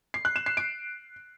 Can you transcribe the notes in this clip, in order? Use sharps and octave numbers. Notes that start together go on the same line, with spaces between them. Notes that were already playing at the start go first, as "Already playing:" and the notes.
C7
F#6
E7
C7
D7